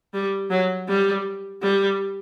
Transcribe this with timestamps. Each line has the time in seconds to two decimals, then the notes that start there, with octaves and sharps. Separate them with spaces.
0.14 G3
0.50 F#3
0.88 G3
1.63 G3